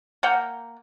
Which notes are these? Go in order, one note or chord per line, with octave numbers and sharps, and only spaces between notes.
A#3 F#5 G5